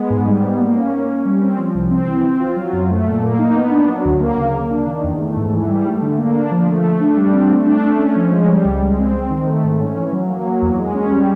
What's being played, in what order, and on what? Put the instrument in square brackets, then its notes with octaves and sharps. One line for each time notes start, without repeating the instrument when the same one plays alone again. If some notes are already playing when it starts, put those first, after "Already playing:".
Already playing: [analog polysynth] G#3 B3
G#2
G3
B3
A#3
C#4
A#3
C#4
G3
C4
F3
C2
C4
E3
C4
F4
F#3
F#2
A3
A#2
A#3
D#4
B3
D4
F#3
D2
A#3
C#3
A#3
D4
D#3
E2
A3
G#2
E3
G3
A3
D3
A#3
D4
F3
A3
A3
D4
G3
C4
A3
D4
A3
C#4
F3
G#3
G3
C#2
G#3
C4
C4
D#3
A3
G#2
C#4
E3
F#3
A#3
F#3
E2
G#3
C#4
G3